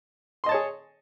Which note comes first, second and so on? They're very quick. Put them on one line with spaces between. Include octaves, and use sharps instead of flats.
C6 D#5 A5 C#5 G#4